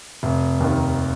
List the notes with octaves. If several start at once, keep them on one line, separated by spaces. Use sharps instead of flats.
F1
D#2 D#3